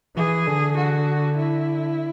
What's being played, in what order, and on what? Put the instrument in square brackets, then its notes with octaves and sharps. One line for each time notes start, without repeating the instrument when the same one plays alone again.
[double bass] E3 [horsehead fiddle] G#4
[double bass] D3
[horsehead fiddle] F#4
E4